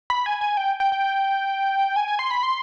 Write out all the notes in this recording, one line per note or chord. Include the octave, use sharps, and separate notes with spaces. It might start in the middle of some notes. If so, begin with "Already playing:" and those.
B5
G#5
G#5
G5
G5
G5
G#5
G#5
C6
B5
C6